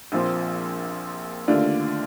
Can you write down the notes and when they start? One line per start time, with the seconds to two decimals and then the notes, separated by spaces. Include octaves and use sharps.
0.12 A#1 A#2 F3 C4
1.48 D#2 D3 A3 D4 F4